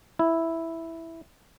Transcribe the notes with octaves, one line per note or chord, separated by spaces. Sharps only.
E4